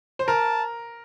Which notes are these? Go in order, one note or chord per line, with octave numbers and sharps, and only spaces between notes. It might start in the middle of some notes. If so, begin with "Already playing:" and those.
C5
A#4 A5